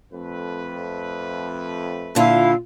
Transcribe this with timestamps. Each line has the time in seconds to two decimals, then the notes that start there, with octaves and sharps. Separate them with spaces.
0.12 F2 A3 B4
2.15 A#2 D3 E4 F4 F5